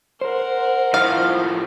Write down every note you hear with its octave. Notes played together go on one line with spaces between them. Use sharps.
A#4 C5 F#5
A2 F3 F5